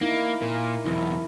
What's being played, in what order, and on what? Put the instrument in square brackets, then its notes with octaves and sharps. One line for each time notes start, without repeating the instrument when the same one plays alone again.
[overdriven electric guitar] A#3 [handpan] D#4 E4
[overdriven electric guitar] A#2 [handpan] A#4
[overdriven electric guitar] B1 E2 [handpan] E4